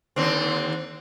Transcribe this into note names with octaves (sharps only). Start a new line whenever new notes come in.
D#2 D3 C4